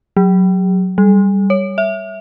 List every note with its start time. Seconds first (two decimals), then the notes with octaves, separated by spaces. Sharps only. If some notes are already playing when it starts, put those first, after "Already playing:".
0.17 F#3
0.98 G3
1.50 C#5
1.78 E5